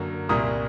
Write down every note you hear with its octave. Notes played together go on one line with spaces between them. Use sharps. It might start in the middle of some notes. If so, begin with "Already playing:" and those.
Already playing: F#2 D3 F#3 A#3
C2 A#2 G3 A#3 D#6